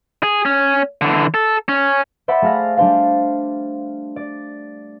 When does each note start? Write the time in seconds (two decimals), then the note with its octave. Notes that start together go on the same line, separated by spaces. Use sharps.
0.23 G#4
0.45 C#4
1.01 D3 E3
1.34 A4
1.69 C#4
2.28 C5 D5 E5 F#5 B5
2.42 A3 G#4 F5 F6 A#6
2.77 G3 D4 C5 F5
4.16 D5